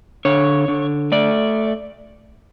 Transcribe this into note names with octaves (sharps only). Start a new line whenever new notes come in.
D3 C#5
D3
A3 D5